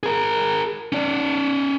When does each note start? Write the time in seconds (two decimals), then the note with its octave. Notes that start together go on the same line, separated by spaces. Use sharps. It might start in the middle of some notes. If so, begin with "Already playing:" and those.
0.03 G#4 A#4
0.92 C#4 D5